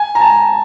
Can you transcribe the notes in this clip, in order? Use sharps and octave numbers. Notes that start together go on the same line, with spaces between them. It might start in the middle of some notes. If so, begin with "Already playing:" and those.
Already playing: G#5
A#5
A5